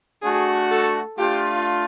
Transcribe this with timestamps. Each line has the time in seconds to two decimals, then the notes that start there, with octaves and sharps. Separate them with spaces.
0.22 A3 D4 F#4 G#4
0.71 A4
1.18 A3 D4 F4 G4